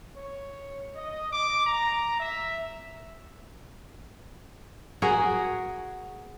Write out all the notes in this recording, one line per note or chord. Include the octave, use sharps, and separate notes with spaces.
C#5
D#5
D6
A#5
E5
F#4 G#4 A#4 F#5